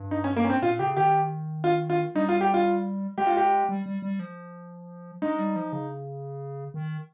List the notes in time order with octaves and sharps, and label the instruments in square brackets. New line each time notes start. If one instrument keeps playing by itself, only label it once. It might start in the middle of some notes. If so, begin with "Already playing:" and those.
Already playing: [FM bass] G2
[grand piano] D#4
C#4
A#3
C#4
C4
[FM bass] A#2 [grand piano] F4
[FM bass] C#3 [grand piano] G4
[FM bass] D#3 [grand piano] G4
[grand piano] F4
F4
[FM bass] G3 [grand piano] D#4
[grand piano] F4
G4
F4
[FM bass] G#3 [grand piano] G4
[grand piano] F4
G4
[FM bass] G3
G3
G3
F3
[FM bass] G#3 [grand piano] D#4
[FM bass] G3
F3
C#3
D#3